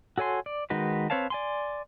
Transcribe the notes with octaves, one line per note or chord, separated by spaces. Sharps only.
F#4 A4 C#5 G#5 C6
D5
D#3 G#3 D#4 F#4 B4
C4 B4 C#5 F5 A5
D5 G#5 C6